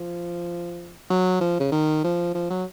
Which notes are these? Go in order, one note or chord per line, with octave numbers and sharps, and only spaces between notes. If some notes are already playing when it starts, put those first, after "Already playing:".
Already playing: F3
F#3
F3
C#3
D#3
F3
F3
F#3